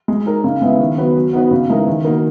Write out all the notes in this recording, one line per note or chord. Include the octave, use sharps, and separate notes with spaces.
G#3
D#4 A#4
C#3
G#3 B3 E4
D#3
F#3 B3 F#4 B4
F#3
B3 D#4 F#4 B4
C#3
E3 G#3 D#4 A#4
D#3
A#3 D#4 F#4 A#4